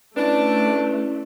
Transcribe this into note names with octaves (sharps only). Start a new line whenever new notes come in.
A3 C#4 D4 E4 B4 D5